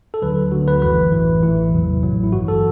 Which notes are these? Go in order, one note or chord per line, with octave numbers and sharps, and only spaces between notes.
A4
D2 D3 F#3 B4
D2 D3 F#3 F#4
B4
G1 F#2 E3 B4
A1 A2 E3
A1 A2 E3 E4
E2 C3 F#3
A1 A2 F#3
E4
G1 G2 E3 F#4
A4